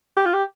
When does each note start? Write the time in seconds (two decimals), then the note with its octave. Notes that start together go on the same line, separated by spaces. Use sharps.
0.17 G4
0.26 F4
0.34 G4